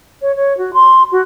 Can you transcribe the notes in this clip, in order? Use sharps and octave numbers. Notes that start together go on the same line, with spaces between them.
C#5
C#5
F#4
C6
F#4